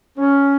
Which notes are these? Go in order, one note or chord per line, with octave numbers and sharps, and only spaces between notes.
C#4